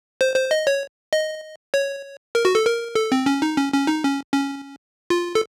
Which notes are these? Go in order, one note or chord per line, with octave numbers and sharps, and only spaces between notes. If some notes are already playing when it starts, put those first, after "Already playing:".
C5
C5
D#5
C#5
D#5
C#5
A#4
F#4
A4
A#4
A4
C4
C#4
D#4
C#4
C#4
D#4
C#4
C#4
F4
A4